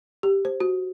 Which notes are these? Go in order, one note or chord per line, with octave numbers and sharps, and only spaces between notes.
G4
C5
F#4